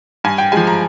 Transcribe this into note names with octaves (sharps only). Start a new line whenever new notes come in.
G2 G#5
G5
F3 G#3 G#5
A#5